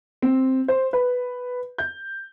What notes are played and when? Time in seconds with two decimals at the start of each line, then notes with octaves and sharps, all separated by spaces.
0.22 C4
0.68 C5
0.93 B4
1.78 G6